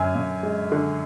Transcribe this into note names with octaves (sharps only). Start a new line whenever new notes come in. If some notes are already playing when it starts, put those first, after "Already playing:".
Already playing: F#2 D3 G#5
F#2
G#3
D3